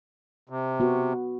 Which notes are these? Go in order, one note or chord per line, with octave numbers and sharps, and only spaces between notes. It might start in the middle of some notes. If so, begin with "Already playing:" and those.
C3
B3 F#4